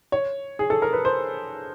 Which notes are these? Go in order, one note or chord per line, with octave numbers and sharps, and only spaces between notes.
C#5
G#4
A4
A#4
B4
C5